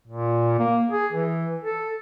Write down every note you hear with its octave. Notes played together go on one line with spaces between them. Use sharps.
A#2
A#3
G#4
E3
A4